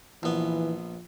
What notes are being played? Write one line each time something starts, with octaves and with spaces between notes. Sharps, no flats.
A#1 E3 B3